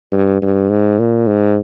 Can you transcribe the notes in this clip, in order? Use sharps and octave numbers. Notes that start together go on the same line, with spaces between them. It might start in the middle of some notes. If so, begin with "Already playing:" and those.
G2
G2
G#2
A#2
G#2